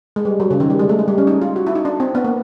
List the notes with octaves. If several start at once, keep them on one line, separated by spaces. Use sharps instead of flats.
G#3
G3
F#3
C#3
D#3
G3
G#3
A3
G#3
G3
C#4
D#4
F4
F#4
E4
D#4
D4
C4
B3
A#3